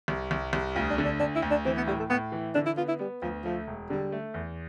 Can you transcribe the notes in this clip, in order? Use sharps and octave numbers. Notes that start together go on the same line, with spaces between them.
C2
C2
C2
D2 F4
D4
D3
D4
D2 D4
E4
D2
D4
E3 C4
B3
A2 G3
A3
A2 B3
E3
D3 D4
E4
B3 F4
E4
G3 B3
D2 F3
F3 A3
E1
D3 G3
A3
E2